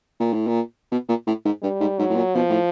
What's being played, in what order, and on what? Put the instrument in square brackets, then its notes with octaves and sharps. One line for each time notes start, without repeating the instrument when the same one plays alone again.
[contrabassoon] A#2
A2
A#2
B2
A#2
A2
G#2
[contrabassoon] G2 [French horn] G3
[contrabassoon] G#2
[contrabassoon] G#2 [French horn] F#3
[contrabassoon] A2
A#2
[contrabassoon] B2 [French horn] F3
[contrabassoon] A2